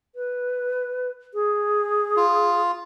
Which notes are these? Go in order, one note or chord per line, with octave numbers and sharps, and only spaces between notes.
B4
G#4
F4